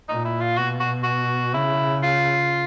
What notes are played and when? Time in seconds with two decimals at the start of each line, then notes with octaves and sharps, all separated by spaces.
0.09 A#2 D#4
0.25 E4
0.41 F4
0.57 B2 F#4
0.80 F#4
1.03 F#4
1.54 C#3 E4
2.03 F4